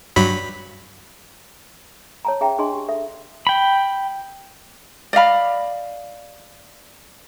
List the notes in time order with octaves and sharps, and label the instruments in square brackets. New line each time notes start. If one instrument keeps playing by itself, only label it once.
[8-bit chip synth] G2 F#3 B5
[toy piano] C#5 A5 A#5
C#4 G#4 E5 G5 A#5
D4 G#4 D#5 A5 C6
G4
A4 E5
[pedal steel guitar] G5 B5
[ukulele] D5 D#5 F5 B5